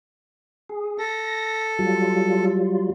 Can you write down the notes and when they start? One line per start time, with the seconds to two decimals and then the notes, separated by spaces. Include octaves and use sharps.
0.69 G#4
0.99 A4 A#6
1.79 F#3 G3 F4